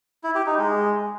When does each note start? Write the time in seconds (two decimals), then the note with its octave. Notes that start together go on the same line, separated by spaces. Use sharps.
0.24 E4
0.35 G4
0.47 D#4
0.58 G#3